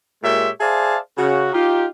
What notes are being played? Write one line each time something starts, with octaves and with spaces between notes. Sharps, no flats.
A#2 G#3 G4 A#4 C#5 E5
G#4 C5 D5 E5 F5 A5
C#3 F#4
D#4 F4 G4